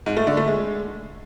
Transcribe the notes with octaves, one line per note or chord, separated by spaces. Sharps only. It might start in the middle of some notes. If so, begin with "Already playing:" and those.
G#2
A3
D3
A3
G#3